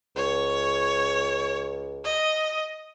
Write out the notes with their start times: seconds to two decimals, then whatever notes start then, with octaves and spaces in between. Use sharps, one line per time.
0.16 C#2 C#5
2.04 D#5